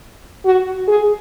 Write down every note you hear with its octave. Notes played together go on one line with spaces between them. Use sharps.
F#4
G#4